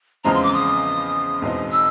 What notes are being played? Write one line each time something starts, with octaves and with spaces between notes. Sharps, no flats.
E2 C#3 F3 G#3 C4 A#5
C6
D6
D#6
E2 B2 G#3 C4 D#4
E6